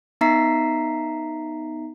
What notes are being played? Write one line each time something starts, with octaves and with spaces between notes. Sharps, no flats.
B3 D#4 E5 A#5 B6 C7